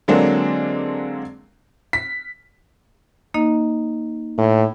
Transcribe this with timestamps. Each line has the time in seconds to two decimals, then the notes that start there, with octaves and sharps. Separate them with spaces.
0.08 D3 F#3 G#3 A#3 C4 D4
1.93 B6
3.34 A#3 D#4 D#5
4.38 A2